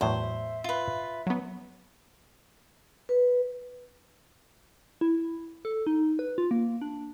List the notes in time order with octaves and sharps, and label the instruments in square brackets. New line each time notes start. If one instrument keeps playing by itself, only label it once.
[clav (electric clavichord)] E2 A2 F#3 [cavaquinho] C5 [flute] E5
[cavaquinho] F4 B4
[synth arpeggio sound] F#3 B3
[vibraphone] B4
[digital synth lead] E4
A4
D#4
B4
F4
A#3
D4